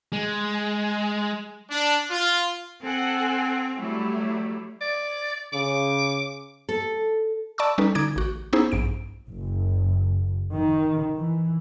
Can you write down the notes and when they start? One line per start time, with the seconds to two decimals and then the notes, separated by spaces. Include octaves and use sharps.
0.13 G#3
1.70 D4
2.10 F4
2.82 C4 A4 F#5 G#5
3.77 F#3 G3 A3 E4
4.81 D5
5.53 C#3 D6
6.69 A4
7.58 D5 A5 B5 C#6 D6 E6
7.78 G3 C#4 D#4 A4 B4
7.95 D3 D#4 D6 G#6 D7
8.16 A1 F#4
8.53 B3 C#4 D#4 E4 G#4 C5
8.72 A#1 G2 D7
9.28 F#1
10.53 D#3
11.17 E3